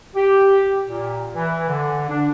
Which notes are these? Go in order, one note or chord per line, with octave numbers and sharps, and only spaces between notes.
G4
A#2
E3
D3
D4